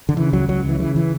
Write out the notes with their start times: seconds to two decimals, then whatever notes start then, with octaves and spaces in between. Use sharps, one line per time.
0.09 D3
0.17 C#3 E3
0.33 C#2 F#3
0.49 C#2 F#3
0.64 C#3 E3
0.79 C#3 E3
0.96 E3